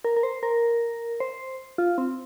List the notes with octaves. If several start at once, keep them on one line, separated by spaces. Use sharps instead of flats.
A#4
A#4
C5
A#4
C5
F4
C4